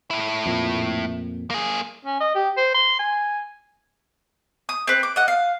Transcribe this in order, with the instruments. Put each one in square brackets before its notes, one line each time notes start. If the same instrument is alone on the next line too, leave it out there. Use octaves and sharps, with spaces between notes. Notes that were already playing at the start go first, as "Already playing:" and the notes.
[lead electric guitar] A2 E4
[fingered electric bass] F2 A#2
[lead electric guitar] A#3 G#4
[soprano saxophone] C#4
D#5
G4
C5
C6
G#5
[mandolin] D#6
C4 B4
D6
D#5 F#5
F5